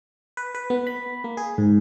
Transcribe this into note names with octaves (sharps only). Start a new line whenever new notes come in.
B4
B4
B3
B5
A#3
G#4
G#2